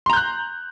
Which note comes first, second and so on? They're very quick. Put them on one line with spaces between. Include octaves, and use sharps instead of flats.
C6 A#5 G6 F#6